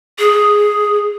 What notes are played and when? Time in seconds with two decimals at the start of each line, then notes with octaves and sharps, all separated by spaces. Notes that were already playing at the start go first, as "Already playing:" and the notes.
0.19 G#4